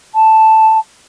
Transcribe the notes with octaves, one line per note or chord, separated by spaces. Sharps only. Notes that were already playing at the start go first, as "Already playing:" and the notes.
A5